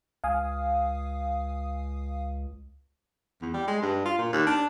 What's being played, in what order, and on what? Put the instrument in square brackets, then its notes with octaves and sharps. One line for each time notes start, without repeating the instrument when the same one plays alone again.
[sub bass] C#2 [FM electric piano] F5 G#5 D#6
[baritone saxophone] E2
G3
G#3
G2
F4
A#2
D#2
D4